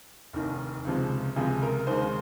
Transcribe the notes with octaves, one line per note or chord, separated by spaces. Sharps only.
F1 D#2 D#3
C#2 C3 F3 G#3
C#2 C3 F3 G#3 G#4
A#4
D#2 D#3 G#3 C5